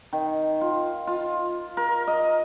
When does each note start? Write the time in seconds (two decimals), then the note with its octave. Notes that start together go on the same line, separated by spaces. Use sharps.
0.13 D#3
0.61 F4
1.07 F4
1.77 A#4
2.07 D#5